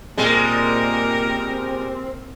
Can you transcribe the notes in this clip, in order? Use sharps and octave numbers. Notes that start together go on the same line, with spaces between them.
A#2 G3 G#3 C4 A#4